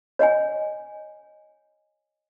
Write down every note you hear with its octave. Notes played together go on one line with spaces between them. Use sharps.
C#5 D#5 F#5 G#5